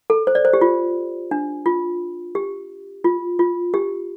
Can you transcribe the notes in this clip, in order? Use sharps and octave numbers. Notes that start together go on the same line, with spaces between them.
A4
C5
D5
C5
G4
F4
D4
F4
G4
F4
F4
G4